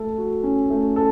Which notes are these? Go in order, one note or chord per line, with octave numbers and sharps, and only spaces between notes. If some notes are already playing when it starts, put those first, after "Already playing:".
Already playing: A3 A4
F#4
C#4
A3
A4